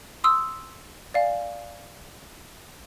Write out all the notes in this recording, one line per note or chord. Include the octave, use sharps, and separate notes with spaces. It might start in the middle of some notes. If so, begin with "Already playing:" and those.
C6 D#6 E6
D5 F5 G#5